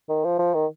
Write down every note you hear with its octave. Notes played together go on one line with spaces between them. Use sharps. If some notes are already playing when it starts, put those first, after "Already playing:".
D#3
F3
F3
D#3